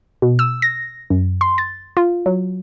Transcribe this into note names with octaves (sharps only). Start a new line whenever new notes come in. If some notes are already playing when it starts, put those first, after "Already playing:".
B2
E6
A#6
F#2
C6
A6
F4
F#3